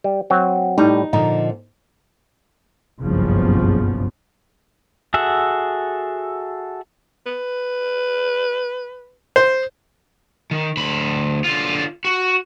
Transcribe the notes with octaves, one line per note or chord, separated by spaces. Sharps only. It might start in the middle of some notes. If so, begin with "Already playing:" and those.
G3
F#3 C4 F#4
A2 G3 D#4
A#2 D3 F3 D#4
F#1 B1 G2 C#3 F3 B3
F#4 G#4 A4 E5 F#5
B4
C5
D#3
D2 B5
D3 F4
F#4